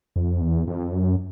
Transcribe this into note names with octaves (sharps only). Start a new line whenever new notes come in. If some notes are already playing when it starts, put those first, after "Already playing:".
F2
E2
F2
F#2